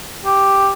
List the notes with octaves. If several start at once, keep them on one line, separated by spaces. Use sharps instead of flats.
G4